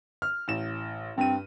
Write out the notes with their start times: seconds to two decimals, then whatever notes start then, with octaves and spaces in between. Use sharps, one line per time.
0.22 F6
0.48 A1 E7
1.18 G2 C4 D#7